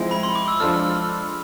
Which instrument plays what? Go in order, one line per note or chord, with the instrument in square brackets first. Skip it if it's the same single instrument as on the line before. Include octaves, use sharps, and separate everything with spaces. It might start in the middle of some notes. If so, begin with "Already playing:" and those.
Already playing: [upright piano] F3 G#3 C4 E4
[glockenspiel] B5
C6
D6
E6
[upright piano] F3 G#3 D4 F4 A4 [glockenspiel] F6